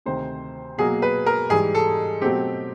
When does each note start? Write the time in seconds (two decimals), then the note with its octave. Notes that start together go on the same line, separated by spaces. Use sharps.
0.06 D2 C3 D#3 C5
0.78 B2 F#3 A#3 G#4
1.02 B4
1.26 A#4
1.49 G#2 E3 G3 G#4
1.75 A4
2.22 B2 F#3 A3 C4 G4